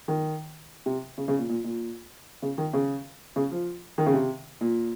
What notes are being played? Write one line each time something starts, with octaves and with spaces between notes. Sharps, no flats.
D#3
C3
C#3
C#3
A#2
A#2
A#2
C#3
D#3
C#3
C#3
F3
D#3
C#3
C3
A#2